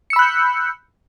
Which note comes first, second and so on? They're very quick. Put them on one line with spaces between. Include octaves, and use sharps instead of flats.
C#7 E6 B5 F#6 G6